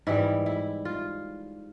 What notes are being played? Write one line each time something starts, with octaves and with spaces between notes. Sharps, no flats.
G#2 E3 G3 E4
E4
F4